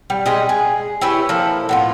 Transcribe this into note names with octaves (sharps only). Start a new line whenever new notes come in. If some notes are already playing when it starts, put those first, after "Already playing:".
G3
G#3 G4 D#5
G#4
E4 G4 B4 C#5
F3 A#3 E4 A4
A2 B3 F4